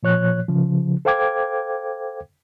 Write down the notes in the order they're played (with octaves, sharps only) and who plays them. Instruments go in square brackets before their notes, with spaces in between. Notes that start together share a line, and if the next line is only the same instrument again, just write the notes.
[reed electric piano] A#2 F3 C#5 F#6
C#3 F3
A4 C5 F5 G5 D6 G#6